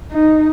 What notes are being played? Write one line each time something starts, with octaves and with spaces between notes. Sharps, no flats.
D#4